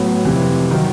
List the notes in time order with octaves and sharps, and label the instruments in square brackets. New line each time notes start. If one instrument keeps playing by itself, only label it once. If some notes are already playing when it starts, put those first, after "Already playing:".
Already playing: [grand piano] A2 F#3 B3
F2 C3 E3
D#3 F#3